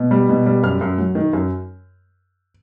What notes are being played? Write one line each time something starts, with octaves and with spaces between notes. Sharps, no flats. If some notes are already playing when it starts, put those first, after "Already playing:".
Already playing: B2
G3
B2
G3
F#2 F6
F#2
F#3
D#3
F#2